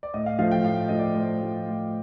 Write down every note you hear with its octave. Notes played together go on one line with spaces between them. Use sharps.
D5
A2 D#5
F5
F3 A3 F5
G5
A2 F5
F3 A3 D#5
D5
A2 C5
F3 A3
A2